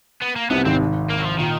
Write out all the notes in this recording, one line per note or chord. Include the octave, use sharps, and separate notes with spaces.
B3
A#3
C2 C3 B3
G#1 G#2 C4
A#3
F#3
F3
A#2 D#3